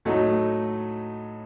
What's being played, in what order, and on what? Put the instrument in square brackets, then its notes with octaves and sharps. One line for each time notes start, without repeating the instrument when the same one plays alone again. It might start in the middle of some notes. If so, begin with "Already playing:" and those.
[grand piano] A2 F#3 A3 D#4